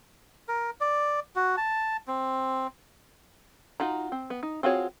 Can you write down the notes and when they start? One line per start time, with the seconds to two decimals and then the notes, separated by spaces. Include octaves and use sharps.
0.48 A#4
0.81 D5
1.36 F#4
1.57 A5
2.08 C4
3.80 D#4 F4 F#4 A#5
4.12 C4
4.30 B3
4.43 D#4
4.63 C4 F4 F#4 G#4 C#5